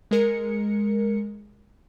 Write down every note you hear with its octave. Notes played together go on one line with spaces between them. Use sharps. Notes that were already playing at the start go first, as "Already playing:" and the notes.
G#3 A#4 C#7